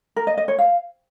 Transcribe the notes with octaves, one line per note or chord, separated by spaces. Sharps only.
A#4
D#5
D#5
C#5
F5